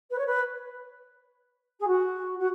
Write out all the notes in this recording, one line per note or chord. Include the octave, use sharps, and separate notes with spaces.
B4
C#5
B4
G#4
F#4
F#4